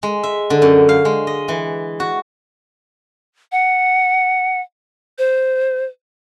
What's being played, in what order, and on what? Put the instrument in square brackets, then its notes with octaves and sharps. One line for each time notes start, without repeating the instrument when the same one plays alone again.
[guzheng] G#3
E5
D3
F#2
F5
G#3
D#5
E3
F#4
[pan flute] F#5
C5